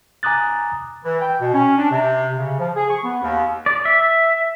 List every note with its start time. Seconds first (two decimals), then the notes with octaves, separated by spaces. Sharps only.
0.23 G#5 A#5 D6 D#6 F#6 A6
1.04 E3
1.21 G5
1.41 B2
1.54 C#4
1.78 D4
1.91 C3
2.38 C#3
2.60 F3
2.76 G#4
2.90 C#6
3.04 B3
3.23 D#2
3.66 D5
3.85 E5